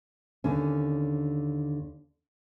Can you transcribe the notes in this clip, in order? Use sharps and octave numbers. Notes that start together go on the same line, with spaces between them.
D#2 D3 C#4